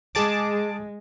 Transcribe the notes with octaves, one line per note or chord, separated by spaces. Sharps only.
G#3 G#4 A5 D6